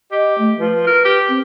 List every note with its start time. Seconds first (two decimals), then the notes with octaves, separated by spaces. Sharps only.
0.12 G4 D#5
0.39 A3
0.59 F3 B4
0.87 A#4
1.05 G4
1.29 C4